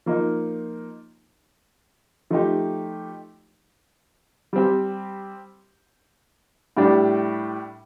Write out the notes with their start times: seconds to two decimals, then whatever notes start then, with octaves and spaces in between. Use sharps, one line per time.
0.06 F3 A#3 D#4
2.30 F3 A3 D#4 G4
4.53 G3 C4 G4
6.77 A2 G3 D4 G4